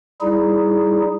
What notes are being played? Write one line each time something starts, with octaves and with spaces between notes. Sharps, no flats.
G3 D#4 E4 G#4